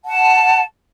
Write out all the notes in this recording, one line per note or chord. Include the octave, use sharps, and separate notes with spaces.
F#5 A5